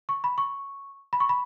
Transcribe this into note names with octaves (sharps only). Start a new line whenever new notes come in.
C#6
B5
C#6
B5
C#6
B5